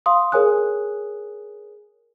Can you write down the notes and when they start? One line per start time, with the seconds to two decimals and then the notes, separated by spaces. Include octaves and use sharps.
0.06 F5 C6 D#6
0.32 G#4 A#4 C#5 G#5 D#6 F#6